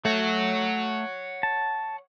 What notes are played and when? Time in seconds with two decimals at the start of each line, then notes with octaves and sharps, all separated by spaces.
0.05 A3 C#5 F#5
1.43 A5